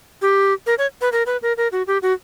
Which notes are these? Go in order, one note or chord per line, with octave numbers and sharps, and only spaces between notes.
G4
A#4
C#5
B4
A#4
B4
A#4
A#4
F#4
G4
F#4